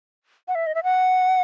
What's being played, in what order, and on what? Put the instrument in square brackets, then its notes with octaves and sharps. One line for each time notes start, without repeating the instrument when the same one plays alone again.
[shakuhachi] F#5
E5
D#5
E5
F#5